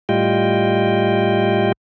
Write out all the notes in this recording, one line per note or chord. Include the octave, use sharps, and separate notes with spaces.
A2 G3 F4 D#5 G5